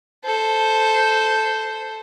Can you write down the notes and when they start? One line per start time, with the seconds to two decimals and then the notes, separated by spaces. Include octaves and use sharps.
0.25 A4 C5